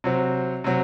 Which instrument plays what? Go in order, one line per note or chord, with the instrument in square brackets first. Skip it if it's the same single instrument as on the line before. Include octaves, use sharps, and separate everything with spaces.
[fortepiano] C3 F#3 C4
C3 F#3 C4